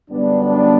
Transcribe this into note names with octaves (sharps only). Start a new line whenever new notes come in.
F#2 D3 G3 B3 D4
D4